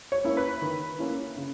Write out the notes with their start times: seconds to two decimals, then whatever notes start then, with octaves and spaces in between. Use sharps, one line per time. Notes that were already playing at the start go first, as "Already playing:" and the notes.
0.12 C#5
0.24 A#3 C#4 E4
0.37 B4
0.62 D#3
0.99 A#3 C#4 E4
1.36 C#3